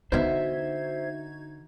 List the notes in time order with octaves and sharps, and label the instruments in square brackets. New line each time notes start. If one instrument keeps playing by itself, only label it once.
[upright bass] D3 B3 [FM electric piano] D#4 F#4 G#6 [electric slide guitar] C5 E5